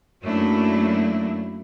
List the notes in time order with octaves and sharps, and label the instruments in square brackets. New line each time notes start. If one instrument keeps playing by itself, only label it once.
[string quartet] F#2 F#3 A3 A#3 D4 E4